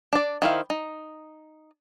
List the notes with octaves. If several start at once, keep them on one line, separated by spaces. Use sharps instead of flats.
D4 D5
D#3 E4 C5 F5
D#4